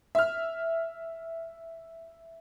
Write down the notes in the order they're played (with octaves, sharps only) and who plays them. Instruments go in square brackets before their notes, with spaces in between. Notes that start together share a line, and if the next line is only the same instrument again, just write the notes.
[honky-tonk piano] E5 F6